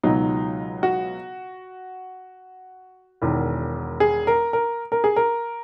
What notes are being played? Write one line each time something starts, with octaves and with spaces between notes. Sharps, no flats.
C#2 B2 F#3 D#4
F#4
E1 E2 D#3
G#4
A#4
A#4
A#4
G#4
A#4